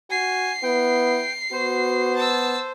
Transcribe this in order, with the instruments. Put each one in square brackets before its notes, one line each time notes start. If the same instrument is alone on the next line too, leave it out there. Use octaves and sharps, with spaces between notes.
[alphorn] F#4 [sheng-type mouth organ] G#5 [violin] C7
[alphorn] B3 [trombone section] E4 B4 [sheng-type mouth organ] G5
[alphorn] B3 [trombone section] F#4 [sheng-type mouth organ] C5
[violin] A5 E6